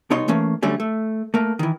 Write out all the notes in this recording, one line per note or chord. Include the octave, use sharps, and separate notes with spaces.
C2 B2 D#4 C#5 C6
E3 A3 A#3 C#4
D3 F#3 G3 A3 C#4
A3
A3 A#3
D#3 E3